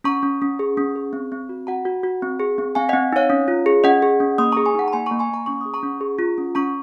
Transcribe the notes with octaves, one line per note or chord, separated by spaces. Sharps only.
C#4 A#5 C#6
C#4
C#4
G#4
C#4
G#4
C4
C4
F#4
F#4 F#5 A#5
F#4
F#4
C4
G#4
C4
C4 F5 G#5
C4 D#5 F#5
D#4 C#5 F5
C#4
F4
G#4
C#4 D#5 F#5
G#4
C#4
A#3 C6 D#6
G#4 A#5 C#6
G#5 C6
D#4 F#5 A#5
A#5
A#3 G#5 C6
A#3 A#5 C#6
G#5 C6
A#3 A#5 C#6
C#4 C#6
G#4 D#6
A#5 C#6
C#4
G#4
F4
C#4
C#4 A#5 C#6